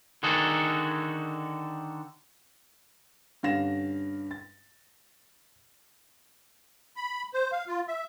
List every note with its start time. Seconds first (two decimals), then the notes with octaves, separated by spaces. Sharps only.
0.23 D3 D#3 D#4 F#4 G#4 A4
3.43 G2 D3 C#4 F5 A#6 E7
4.31 A6
6.96 B5
7.34 C5
7.52 F5
7.67 F4
7.88 E5